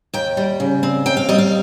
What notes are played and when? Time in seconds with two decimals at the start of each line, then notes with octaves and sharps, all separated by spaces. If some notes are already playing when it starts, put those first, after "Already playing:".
0.14 D#2 G5
0.37 G3
0.60 C#3
0.83 C4
1.06 D#2 G5
1.17 F5
1.29 G3 D#5
1.38 F5